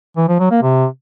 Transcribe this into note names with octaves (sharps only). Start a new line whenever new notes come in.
E3
F3
F#3
A#3
C3